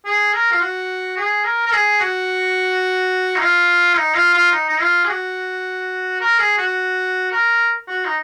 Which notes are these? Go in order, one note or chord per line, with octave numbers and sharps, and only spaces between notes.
G#4
A#4
F4
F#4
G#4
A#4
A#4
G#4
F#4
D#4
F4
D#4
F4
F4
D#4
D#4
F4
G#4
F#4
A#4
G#4
F#4
A#4
F#4
D#4